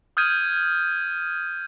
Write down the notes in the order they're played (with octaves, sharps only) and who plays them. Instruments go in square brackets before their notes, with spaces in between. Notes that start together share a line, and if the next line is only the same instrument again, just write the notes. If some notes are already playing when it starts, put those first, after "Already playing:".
[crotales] D#6 F6 G6 G#6 D#7